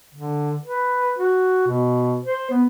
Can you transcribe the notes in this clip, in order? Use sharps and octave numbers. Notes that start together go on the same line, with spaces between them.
D3
B4
F#4
B2
C5
B3